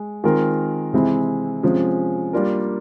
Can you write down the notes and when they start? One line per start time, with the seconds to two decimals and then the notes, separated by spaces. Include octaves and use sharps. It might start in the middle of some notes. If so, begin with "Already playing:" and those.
Already playing: G#3
0.24 D#3 G#3 C4 F4 A#4
0.93 C3 E3 G#3 C4 E4
1.63 C3 F3 G#3 C#4
2.33 G3 A#3 D4 F4 A#4